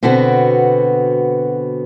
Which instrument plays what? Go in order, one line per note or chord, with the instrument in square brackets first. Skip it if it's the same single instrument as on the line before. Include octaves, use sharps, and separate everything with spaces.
[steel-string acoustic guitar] B2 D3 B3 C4 F#4